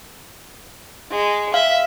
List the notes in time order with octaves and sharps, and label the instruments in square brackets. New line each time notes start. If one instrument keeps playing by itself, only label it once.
[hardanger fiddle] G#3
[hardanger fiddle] E5 [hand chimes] F5